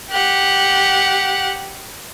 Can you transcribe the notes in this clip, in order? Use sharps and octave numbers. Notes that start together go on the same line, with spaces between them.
G4 F#5